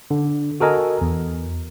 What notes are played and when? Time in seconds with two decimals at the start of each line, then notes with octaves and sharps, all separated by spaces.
0.11 D3
0.60 F#4 A4 A#4 D#5 G#5
1.01 E2